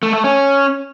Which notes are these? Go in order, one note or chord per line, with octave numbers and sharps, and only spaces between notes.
A3
A3
C#4